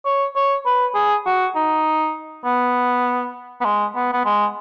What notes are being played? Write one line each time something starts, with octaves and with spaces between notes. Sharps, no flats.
C#5
C#5
B4
G#4
F#4
D#4
B3
B3
G#3
B3
B3
G#3